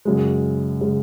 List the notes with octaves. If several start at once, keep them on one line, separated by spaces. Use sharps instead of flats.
F#2 C#3 G#3
C#3 G#3